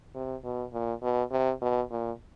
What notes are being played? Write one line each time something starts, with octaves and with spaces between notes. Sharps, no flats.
C3
B2
A#2
B2
C3
B2
A#2